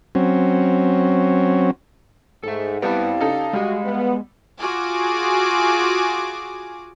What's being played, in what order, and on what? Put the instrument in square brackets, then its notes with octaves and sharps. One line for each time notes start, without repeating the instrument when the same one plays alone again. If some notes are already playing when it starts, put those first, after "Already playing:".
[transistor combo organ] F#3 C4 C#4
[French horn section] G#2 [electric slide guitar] A4 E5
[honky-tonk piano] G3 B3 [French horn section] C4 E4 [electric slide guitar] G4 D5 A5 [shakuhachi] F5
[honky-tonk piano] C#3 D#4 A4
[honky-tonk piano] G3 [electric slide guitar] G#3 D#5 [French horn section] F#4
[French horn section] B3
[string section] F4 F#4 G#4 G#5 D6